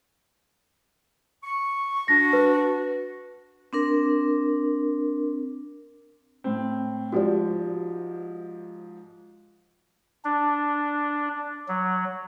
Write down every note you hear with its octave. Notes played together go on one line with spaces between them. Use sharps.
C#6
D4 F#4 A#6
B4
C4 D4 A#4
A2 C4
G#2 F3 F#4 G4 D5
D4
F#3